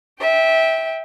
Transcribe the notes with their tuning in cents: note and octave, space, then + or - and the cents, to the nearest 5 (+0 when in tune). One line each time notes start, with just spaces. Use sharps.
E5 -20 G5 +5